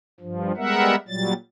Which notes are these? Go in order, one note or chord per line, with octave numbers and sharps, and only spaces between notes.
G2 F3
G3 G#3 B3 A#4 E5 F#5
A#2 F#3 G3 A6